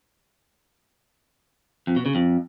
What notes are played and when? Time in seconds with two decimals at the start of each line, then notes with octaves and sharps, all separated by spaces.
1.87 F2
1.96 B2
2.06 C#3
2.15 F2